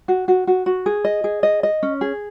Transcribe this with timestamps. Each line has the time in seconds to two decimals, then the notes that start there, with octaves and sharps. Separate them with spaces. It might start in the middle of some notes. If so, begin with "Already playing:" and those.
0.08 F#4
0.28 F#4
0.47 F#4
0.66 F#4
0.86 G#4
1.05 D#5
1.24 G#4
1.43 D#5
1.63 D#5
1.83 C#4
2.01 G#4